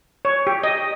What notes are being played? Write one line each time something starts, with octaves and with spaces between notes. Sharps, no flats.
C#5
G4
D#5